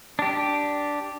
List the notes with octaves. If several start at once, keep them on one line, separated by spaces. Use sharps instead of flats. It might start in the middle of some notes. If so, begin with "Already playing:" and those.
D4 G4